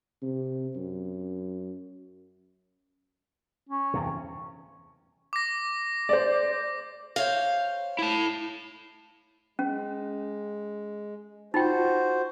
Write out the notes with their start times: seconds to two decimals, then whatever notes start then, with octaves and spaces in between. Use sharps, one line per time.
0.23 C3
0.76 F#2
3.69 C#4
3.94 E2 G2 C3
5.33 D6 A#6
6.09 C5 D5
7.16 C5 C#5 F5
7.99 E4 A5
9.59 G#3 C#4
11.54 D#4 F4 F#4 C5 G5